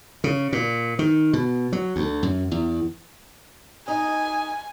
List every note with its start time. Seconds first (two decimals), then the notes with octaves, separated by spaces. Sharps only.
0.24 C#3
0.52 A#2
0.99 D#3
1.33 B2
1.73 F#3
1.96 D2
2.23 F#2
2.51 E2
3.88 D#4 D#5 G#5